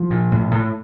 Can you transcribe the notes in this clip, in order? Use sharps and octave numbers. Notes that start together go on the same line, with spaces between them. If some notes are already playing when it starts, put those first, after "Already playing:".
Already playing: F3
A#2
A2
A2